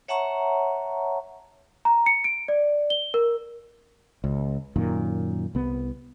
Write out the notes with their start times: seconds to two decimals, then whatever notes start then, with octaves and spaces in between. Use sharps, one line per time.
0.08 C#5 E5 F#5 A5 A#5 C#6
1.85 A#5
2.06 C#7
2.24 D7
2.48 D5
2.90 G7
3.14 A#4
4.24 C#2
4.76 F#2 A#2 D#3
5.55 C2 B3